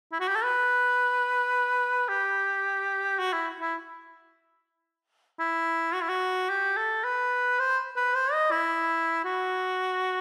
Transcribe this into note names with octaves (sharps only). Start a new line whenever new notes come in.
E4
F#4
G4
A4
B4
G4
F#4
E4
E4
E4
F#4
E4
F#4
G4
A4
B4
C5
B4
C5
D#5
E4
F#4